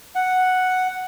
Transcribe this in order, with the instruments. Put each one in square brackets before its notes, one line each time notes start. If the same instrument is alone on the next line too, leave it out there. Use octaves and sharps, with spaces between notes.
[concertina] F#5